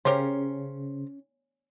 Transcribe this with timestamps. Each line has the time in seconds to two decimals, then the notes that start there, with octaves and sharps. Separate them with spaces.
0.05 C#3 C#4 G4 A#4 C5